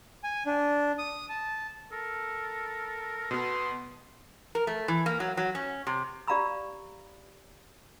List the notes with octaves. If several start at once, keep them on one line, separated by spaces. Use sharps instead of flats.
G#5
D4
D#6
A5
A4 A#4
B2 B3 C6
A#4
A3
E3
A#3
F#3
F#3
C#4
C3
G4 D5 F5 A#5 B5 E6